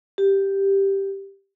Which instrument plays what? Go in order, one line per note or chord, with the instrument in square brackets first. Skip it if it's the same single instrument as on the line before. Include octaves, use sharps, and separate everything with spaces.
[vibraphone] G4